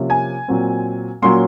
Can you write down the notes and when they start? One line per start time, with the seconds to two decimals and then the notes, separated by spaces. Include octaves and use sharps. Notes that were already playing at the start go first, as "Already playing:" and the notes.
Already playing: C3 F3 A#3 C#4
0.10 G#5
0.48 A#2 F#3 C4
1.22 A#2 F#3 A#3 C#4 C6